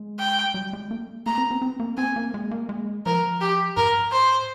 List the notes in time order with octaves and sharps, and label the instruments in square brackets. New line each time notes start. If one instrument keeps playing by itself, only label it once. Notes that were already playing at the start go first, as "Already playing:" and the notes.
Already playing: [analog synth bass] G#3
[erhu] G5
[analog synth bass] G3
G#3
A#3
[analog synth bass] A#3 [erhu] A#5
[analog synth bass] C4
C4
C4
A#3
[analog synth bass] C4 [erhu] G#5
[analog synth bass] A#3
G#3
A#3
G#3
[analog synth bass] F3 [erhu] A#4
[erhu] G4
[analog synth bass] G#2 [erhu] A#4
[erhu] C5